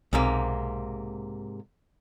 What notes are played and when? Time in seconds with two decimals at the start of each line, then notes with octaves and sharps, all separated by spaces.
0.13 B1 G#2 C3 A#3